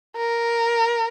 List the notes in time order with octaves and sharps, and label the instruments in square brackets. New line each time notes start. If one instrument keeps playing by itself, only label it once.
[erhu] A#4